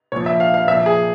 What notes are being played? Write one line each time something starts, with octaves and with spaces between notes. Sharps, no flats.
A#2 F3 C#5
E5
F5
F5
A#2 F3 E5
G#4